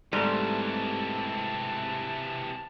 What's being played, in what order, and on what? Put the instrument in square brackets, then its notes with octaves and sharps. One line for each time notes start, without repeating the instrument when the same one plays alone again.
[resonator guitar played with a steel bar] G#2 [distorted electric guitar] C3 E3 [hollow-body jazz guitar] G3 A3 [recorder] A5